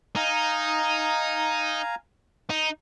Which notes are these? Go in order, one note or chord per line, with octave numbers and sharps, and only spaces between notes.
D#4 F5 G#5 A#5
D#4